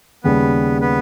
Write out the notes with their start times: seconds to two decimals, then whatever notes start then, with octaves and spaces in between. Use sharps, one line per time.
0.24 D#2 C#3 G3 B3 B4
0.81 B3 B4